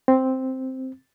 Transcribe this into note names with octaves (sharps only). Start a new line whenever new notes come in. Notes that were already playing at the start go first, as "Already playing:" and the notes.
C4